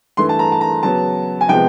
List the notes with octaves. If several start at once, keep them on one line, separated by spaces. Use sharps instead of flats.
G2 E3 A3 C6
A5
A#5
A5
A#5
C#3 F#3 B3 A5
G#5
C3 F3 G#3 B3 G5